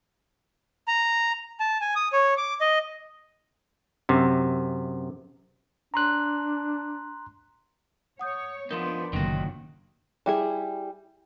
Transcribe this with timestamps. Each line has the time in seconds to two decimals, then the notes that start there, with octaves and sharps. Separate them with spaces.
0.88 A#5
1.60 A5
1.81 G#5
1.96 D#6
2.13 C#5
2.37 D6
2.61 D#5
4.09 F#2 C3
5.94 D4 A#5 C6 F#6
8.19 C#5 F#5 D#6 G6
8.71 F3 B3 D4 D#4 A#4 C6
9.13 F#1 F#2 A#2 D3 D#3 F#4
10.26 G3 E4 G#4